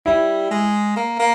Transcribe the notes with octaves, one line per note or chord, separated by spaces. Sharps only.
G3 E4
G#3
A#3
A#3